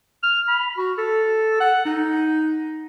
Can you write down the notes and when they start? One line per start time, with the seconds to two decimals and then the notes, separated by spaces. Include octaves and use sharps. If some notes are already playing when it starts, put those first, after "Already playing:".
0.23 F6
0.48 B5
0.77 F#4
0.98 A4
1.60 F#5
1.85 D#4